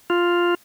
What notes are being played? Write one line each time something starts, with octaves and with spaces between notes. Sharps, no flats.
F4